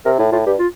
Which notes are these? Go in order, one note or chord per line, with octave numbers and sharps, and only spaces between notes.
C3 A#4
A2 E4
A2 F4
G2 G4
F4